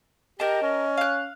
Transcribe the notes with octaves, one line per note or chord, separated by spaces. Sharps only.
G4 A#4 D#5 A5
C#4
F5 F#6